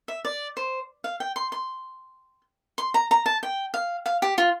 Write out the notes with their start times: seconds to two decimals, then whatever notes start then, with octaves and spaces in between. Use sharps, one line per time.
0.08 E5
0.25 D5
0.57 C5
1.04 F5
1.20 G5
1.36 C6
1.52 C6
2.78 C6
2.94 A#5
3.11 A#5
3.26 A5
3.43 G5
3.74 F5
4.06 F5
4.22 G4
4.38 F4